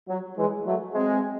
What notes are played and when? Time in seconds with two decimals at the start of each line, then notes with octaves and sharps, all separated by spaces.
0.08 F#3
0.37 E3 G#3
0.65 F#3 A3
0.93 G#3 C4